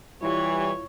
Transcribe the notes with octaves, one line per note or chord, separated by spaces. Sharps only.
E3 G3 E4 F4 C#5